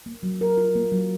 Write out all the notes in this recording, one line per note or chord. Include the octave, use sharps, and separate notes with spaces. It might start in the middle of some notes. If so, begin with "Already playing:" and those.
A#3
F#3
A#4
F4
A#3
F#3